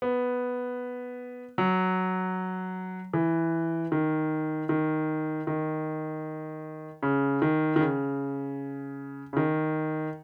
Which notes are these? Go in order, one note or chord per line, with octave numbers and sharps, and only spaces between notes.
B3
F#3
E3
D#3
D#3
D#3
C#3
D#3
D#3
C#3
C#3
D#3